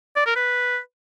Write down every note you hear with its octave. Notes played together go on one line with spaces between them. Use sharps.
D5
A#4
B4